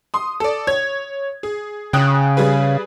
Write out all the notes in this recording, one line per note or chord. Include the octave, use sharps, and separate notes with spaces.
C6 D#6
A4 D5
C#5 G#6
G#4
C#3 G5 D#6 F#6
G3 G#4 B4